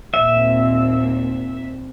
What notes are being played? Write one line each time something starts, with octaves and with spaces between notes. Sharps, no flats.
D#2 A#2 C4 E5